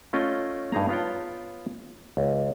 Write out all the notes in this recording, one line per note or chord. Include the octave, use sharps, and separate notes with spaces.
A3 C#4 F4 D#5 G5
G2 D#4 G#4 A#5
B3 F4 C#5 G5
C#2